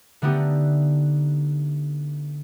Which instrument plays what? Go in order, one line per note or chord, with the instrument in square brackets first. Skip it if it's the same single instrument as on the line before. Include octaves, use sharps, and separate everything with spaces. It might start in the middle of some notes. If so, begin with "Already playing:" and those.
[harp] D3 A3 B3 D#4 G4